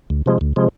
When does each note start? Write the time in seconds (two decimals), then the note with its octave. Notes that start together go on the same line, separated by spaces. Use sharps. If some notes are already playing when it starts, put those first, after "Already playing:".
0.10 D2
0.26 C3 F3 G#3
0.41 D2
0.56 C3 F3 G#3